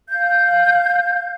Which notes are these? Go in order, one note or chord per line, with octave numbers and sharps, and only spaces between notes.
F5 G6